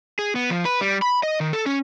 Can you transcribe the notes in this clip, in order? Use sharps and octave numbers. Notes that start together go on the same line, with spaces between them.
G#4
B3
F3
B4
G3
B5
D#5
D#3
A4
C#4